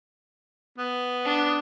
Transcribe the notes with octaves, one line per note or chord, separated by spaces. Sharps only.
B3
D4